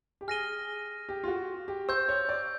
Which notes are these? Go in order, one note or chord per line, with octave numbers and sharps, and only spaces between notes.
G4
G#4 F6 A#6 D#7 G7
G4
F4
F#4
G4
C5 C#6 E6 G6
C#5
D5